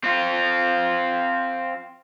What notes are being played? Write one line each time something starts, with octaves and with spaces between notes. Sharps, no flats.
C4 F4